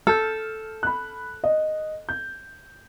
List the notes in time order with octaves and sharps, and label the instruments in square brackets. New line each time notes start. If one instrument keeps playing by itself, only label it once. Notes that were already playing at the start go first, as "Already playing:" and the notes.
[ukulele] A4 [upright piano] F6 G6
[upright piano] B5 F#6
D#5
G6